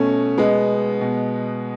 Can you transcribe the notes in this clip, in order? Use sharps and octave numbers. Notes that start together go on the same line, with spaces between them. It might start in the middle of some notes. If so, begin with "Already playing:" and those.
Already playing: B2 A3 C#4
B2 G#3 B3
B2